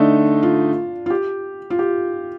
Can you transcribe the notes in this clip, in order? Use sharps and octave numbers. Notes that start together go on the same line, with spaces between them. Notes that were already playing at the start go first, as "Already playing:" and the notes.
Already playing: D3 A3 D4 D#4
F4
F4
G4
F4
G4